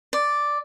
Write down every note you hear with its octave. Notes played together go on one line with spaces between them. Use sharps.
D5